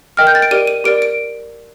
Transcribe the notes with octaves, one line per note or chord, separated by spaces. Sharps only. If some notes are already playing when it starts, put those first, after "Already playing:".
A#4 D#5 G5 F6
G6
A6
D7
G4 A#4 D5 D#7
D#7
G4 A#4 D5 D7
D7